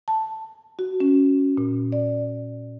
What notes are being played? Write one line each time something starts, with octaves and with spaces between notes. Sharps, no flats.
A5
F#4
C#4
A#2
D5